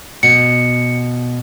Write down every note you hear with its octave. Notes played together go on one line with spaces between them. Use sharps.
B2 C#7